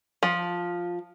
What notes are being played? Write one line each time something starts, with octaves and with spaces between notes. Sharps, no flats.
F3